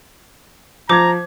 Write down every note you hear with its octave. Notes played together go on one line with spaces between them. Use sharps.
F3 C5 A#5 D6 G#6